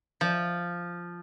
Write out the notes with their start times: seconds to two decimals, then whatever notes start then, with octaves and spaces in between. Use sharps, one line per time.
0.21 F3